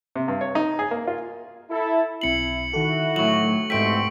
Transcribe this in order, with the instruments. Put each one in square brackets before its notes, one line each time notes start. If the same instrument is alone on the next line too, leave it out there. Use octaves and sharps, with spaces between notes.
[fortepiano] C3
G2
C#5
D#4
G#4
A#3
F4
[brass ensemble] E4 A4
[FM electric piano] B1 C4 C7 [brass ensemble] E4 [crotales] C#7 F#7
[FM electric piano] D#3 A4 [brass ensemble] E4 F#4
[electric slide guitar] A2 F#3 [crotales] C#6 F#7
[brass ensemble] C2 B2 C4 [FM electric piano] G#2 G5 [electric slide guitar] A3 [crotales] B6 D7